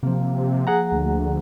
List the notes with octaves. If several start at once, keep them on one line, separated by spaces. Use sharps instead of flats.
C3 F3 A#3
G#4 F#5 A#5
D2